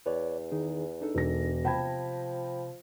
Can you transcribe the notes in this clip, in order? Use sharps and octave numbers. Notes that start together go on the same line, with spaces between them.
E2 B4 C#5 D5
D#3 D#4 G#4
D4 D#4 A4
E1 A#6
C3 F3 G5 A5 B5 G#6